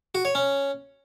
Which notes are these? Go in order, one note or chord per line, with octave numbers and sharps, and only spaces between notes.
F#4
C#5
C#4